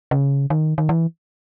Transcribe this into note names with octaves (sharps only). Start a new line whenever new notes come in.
C#3
D#3
D#3
E3